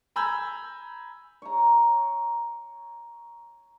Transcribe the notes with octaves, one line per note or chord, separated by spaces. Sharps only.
G#5 A#5 B5 E6 G6 G#6
C#5 A#5